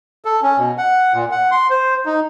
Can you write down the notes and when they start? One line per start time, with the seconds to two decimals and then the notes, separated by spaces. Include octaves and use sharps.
0.25 A4
0.42 C#4
0.58 B2
0.78 F#5
1.14 A#2
1.32 F#5
1.51 C6
1.70 C5
2.06 D#4